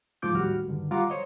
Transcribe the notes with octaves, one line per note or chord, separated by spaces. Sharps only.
G#2 F3 F4 D6 G6
D#2 A2 G3 F#4 F6
G2 D3 D#3
G3 F4 F5 F#5 A#5 D6
C5 C#5 D#5